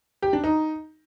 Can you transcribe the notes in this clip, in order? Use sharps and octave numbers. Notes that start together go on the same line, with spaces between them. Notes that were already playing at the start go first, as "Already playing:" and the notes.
G4
D4
D#4